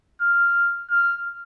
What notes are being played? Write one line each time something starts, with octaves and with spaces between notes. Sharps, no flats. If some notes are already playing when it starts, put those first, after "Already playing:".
F6
F6